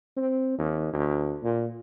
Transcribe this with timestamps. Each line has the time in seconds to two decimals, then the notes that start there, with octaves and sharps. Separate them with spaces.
0.17 C4
0.58 D#2
0.93 D2
1.43 A#2